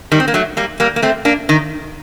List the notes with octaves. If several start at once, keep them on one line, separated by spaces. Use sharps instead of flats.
D#3 G3
C4
A#3
F#3 A3
G3 A#3
G3 A#3
A#3
A3 C4
A#3 D4
D#3